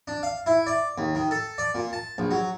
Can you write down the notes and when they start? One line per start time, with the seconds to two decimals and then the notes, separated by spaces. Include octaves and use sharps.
0.08 D4
0.23 F5
0.46 E4
0.67 D5
0.98 D#2
1.15 D#3
1.31 A4
1.58 D5
1.75 A#2
1.93 A5
2.18 A#1
2.31 F#3